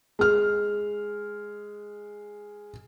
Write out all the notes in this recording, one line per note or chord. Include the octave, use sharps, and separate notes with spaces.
G#3 F6